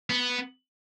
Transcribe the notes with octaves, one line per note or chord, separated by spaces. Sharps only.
B3